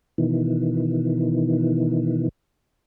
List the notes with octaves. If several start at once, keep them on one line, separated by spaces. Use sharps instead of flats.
B2 D#3 E3